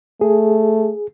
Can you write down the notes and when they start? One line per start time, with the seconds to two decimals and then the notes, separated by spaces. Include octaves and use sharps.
0.21 A3 G#4